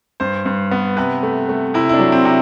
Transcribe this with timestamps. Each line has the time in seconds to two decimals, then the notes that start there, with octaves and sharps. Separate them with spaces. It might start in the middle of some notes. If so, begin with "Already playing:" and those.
0.20 G2 C5
0.46 G2
0.71 B3
0.97 C3 B4
1.23 A3
1.49 A3
1.74 C3 E4
1.89 E4
1.94 D4
1.99 F#3
2.12 C4
2.25 C3